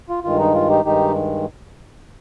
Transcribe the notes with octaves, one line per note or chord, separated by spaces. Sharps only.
F4
G2 D#3 G#3 F4
D#4
F4
D#4 G4
G2 D#3 G#3 D#4 G4